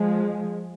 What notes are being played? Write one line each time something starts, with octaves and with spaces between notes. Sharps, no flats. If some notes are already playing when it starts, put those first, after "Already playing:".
Already playing: F3 G#3